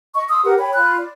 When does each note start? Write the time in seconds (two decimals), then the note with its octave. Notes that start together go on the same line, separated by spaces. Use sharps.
0.14 D#5 C#6
0.29 C6 D#6 E6
0.44 G4 A#4 B4 F#5
0.59 C#5 G5 B5
0.74 F4 B5 F#6
1.00 D5